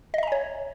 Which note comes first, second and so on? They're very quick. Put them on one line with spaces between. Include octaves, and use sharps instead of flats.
D#5 E5 A#5 G#5 C#5